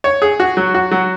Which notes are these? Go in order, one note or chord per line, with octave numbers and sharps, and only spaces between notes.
C#5
G#4
F#4
F#3
F#4
F#3